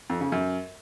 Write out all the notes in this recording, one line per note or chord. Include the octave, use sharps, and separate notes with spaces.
F2
C#3
F#2